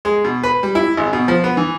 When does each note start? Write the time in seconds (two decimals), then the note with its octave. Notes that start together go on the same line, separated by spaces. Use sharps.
0.05 G#3
0.24 B2
0.43 B4
0.63 G3
0.75 E4
0.97 G#1
1.13 B2
1.28 F3
1.44 B3
1.57 E3